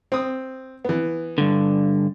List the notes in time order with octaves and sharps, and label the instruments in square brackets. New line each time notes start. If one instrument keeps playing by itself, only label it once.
[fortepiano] C4 D#6
E3 B3
[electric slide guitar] G2 D3